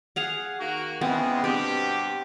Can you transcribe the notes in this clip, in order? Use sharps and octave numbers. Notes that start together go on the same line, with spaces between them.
G#4 F5 F#5
D#3 A#3 F#4
C#3 E3 G#3 B3 C4
G2 B2 C4 G4